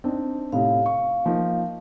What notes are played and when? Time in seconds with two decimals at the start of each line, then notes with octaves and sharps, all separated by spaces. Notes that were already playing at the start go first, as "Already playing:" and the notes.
0.04 C4 D4 D#4
0.52 A2 C3 D#4 F5
0.86 C#6
1.26 F3 A#3 D#4